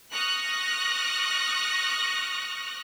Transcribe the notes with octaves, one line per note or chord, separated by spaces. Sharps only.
C#6 D#6 F6 F#6 A#6